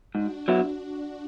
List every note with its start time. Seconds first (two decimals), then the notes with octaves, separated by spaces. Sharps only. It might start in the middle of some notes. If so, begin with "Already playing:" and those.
0.14 G#2 D4 F#4
0.48 F#3 B3 E4